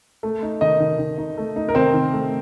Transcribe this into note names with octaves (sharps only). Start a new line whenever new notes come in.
A3
D#4
D#3 D#4 D#5
D#3
D#3
D#4
A3
D#4
A#4
D#3 C4 C5
D#3
A3